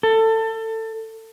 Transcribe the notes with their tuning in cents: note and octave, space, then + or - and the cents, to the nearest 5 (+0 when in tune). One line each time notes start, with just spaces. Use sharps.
A4 +25